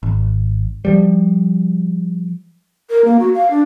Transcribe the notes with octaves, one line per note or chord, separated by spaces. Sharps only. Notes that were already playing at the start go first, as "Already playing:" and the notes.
G#1
F3 G3
A#4
A#3
F#4
F5
D4